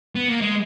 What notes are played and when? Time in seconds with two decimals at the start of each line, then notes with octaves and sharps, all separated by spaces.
0.15 B3
0.29 A#3
0.41 G#3